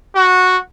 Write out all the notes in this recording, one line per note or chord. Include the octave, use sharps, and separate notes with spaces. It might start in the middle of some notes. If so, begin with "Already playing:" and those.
F#4